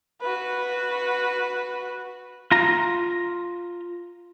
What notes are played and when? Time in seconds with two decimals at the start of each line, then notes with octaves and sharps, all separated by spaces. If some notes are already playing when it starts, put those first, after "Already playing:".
0.21 F#4 B4
2.52 F4 A#5